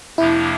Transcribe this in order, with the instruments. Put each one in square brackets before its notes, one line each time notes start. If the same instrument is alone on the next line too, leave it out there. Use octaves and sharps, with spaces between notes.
[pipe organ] F2 C3 F3 A#3 D4 [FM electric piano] E4